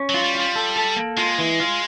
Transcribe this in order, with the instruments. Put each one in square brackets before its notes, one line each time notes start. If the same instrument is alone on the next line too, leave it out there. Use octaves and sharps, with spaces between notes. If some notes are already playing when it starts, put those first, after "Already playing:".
Already playing: [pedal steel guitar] C#4
[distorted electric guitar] F#3 [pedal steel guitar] F4
[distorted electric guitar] G3
[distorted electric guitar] G3 [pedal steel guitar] F4
[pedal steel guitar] A4
A4
A#3
[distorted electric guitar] G#3 [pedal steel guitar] F4
[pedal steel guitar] E3
F4